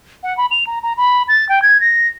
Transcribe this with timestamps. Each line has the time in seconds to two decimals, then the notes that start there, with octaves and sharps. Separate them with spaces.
0.23 F#5
0.37 B5
0.51 F7
0.67 A#5
0.83 A#5
0.97 B5
1.28 A6
1.49 G5
1.62 G#6
1.81 A#6